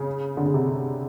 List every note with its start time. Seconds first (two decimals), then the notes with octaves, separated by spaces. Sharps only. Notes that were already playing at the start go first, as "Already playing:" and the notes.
Already playing: C#3
0.37 D3
0.46 C#3
0.54 C3